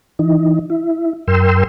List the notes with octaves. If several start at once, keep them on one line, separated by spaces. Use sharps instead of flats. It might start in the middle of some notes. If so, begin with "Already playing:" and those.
E3 D#4
E4
F#2 A#4 G5 C6 E6